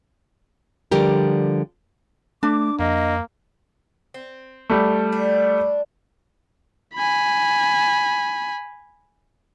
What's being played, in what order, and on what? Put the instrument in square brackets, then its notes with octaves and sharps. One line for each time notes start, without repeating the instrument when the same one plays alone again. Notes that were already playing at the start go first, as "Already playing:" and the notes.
[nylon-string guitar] D3 F3 G3 G4 A#4
[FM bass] A3 [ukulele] D4 [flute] D6
[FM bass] F2 [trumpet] A#3 [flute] D#5
[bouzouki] C4
[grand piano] G3 A3
[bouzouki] D4
[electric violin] G#5 B5